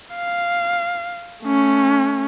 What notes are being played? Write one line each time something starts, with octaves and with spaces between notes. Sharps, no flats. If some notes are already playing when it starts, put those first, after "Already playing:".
F5
A3 C#4